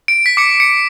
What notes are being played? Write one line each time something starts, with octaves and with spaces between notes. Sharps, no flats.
D7
B6
D6 C#7
C#7